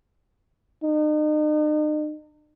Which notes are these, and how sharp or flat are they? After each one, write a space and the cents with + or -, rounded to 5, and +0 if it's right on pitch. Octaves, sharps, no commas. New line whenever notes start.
D#4 -40